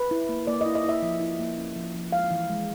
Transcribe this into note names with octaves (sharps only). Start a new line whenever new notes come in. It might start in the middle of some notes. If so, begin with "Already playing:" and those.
Already playing: B4
E4
A#3
A#3 D5
E4 D#5
D#5
E4 E5
F3
E4
A#3
C#4
F3
F3
G#3 F5
E3
G#3